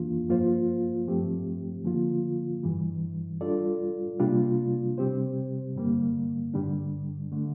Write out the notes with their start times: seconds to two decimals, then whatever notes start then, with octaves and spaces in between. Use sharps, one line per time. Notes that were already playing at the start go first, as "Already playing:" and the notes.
Already playing: F2 E3 A#3 D4 F4
0.29 G2 F3 A#3 F4 C5
1.08 G2 F3 A3 C4 G4
1.85 D3 F3 A#3 F4
2.63 G2 E3 G3
3.41 G3 D4 F4 A4 D5
4.20 C3 G3 A#3 D4 F4
4.98 C3 G3 C4 G4 C5
5.75 G2 D3 G3 A#3
6.54 G2 D3 G3 D4
7.32 D3 A3